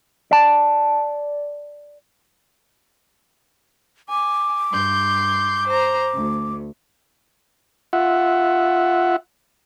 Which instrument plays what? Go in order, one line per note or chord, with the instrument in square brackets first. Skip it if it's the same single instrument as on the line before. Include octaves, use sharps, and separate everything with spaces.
[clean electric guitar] D5 A5
[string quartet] G#5 [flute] D6
[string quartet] G2 C6 G6
C5 A#5
D2
[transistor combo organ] F4 E5 F#5